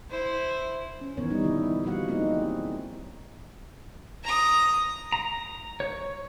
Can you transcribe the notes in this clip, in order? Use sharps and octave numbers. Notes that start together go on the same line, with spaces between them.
E4 C5
C#4
A#2 D#3 E3 B3 A#4 C#5
D#3 G3 D4 D#4
D3 E4
F3 G3 A#3 F#4 F5 F#5
F#3 G#3 A#3 C4 D#4 E4
A#5 D#6
A#5
C#5